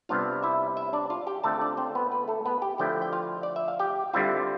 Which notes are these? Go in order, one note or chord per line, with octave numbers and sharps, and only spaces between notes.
C3 G3 B3 D4 F4 F5
E4 E5
E4 E5
D4 D5
F4 F5
G4 G5
D3 A3 C4 F4 A4 A5
D4 D5
C4 C5
B3 B4
B3 B4
A3 A4
B3 B4
G4 G5
D3 F3 A3 E4 G4 G5
G5
F4 F5
D5
E5
F5
G4 G5
D3 G3 C4 E4 F4 E5